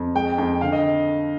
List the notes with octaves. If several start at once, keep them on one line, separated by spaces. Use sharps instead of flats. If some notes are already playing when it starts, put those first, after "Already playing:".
Already playing: F2
G#3 G5
F2 G5
D3 F5
D#5